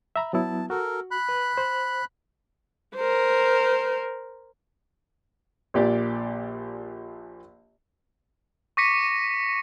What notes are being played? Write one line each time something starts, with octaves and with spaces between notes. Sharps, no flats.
E5 A#5 B5
F#3 B3 E4 A5
F#4 A4 A#4
B5 F#6
B4
C5
A#4 C5
A#1 A#2 G4 D5
C#6 D6 A#6 B6 C#7 D#7